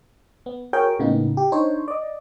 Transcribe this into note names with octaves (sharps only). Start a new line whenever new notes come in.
B3
F#4 G#4 A#4 C#5 G5
A2 C#3 A#3 B3 D#4
G4
D4 D#4 C5 C#5
D5 D#5